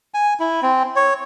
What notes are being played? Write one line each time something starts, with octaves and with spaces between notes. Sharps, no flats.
G#5
E4
C4
C#5